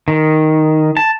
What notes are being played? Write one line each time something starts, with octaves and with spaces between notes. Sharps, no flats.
D#3
A5